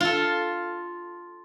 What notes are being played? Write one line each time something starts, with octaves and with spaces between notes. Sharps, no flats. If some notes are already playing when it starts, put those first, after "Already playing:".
F4 A4